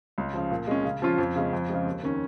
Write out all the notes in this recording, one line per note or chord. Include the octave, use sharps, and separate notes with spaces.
C#2
C#3 F3
A#2
G#3 C#4
C#3
F3 C#4 F4
F2
C#3 G#3 C#4
F2
C#3 F3 G#3
D#2
D#3 C#4